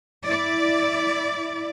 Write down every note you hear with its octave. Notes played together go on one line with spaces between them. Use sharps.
E4 D5